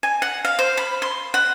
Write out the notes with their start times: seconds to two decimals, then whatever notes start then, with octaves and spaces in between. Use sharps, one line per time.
0.03 G#5
0.22 F#5
0.45 F5
0.59 C5
0.77 B5
1.02 C6
1.34 F#5